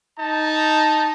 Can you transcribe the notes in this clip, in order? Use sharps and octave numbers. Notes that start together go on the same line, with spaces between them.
D#4 A5